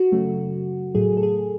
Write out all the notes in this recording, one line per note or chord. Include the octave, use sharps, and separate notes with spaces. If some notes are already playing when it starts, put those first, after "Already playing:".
Already playing: F#4
F#2 C#3 F#3 A3
A2 F#3 A3 G#4
A4
G#4